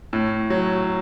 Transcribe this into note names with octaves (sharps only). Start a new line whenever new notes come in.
A2
F#3